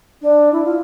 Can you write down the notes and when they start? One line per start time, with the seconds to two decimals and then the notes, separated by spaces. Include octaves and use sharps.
0.21 D4
0.52 E4
0.64 F4